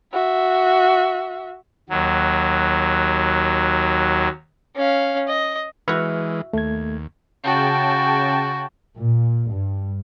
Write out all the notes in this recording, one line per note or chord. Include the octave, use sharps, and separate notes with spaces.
F#4 E5
D#2 F#3
C#4 F5
D#5
E3 G#3 E4 F#4 B4 C#6 F6
D#2 A3 G#6
C#3 F#4 G5 A5
A#2
G2